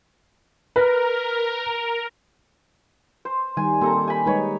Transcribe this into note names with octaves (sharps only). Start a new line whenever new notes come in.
A#4 B4
C5
D#3 G3 G#5
A#3 C4 G4 A4 A#5
G#5 B5
G3 G#3 D#4 B4 C#5